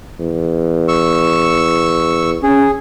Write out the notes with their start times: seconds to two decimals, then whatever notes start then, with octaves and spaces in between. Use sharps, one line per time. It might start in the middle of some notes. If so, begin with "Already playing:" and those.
0.20 E2
0.88 C#6 E6
2.43 C#4 G#4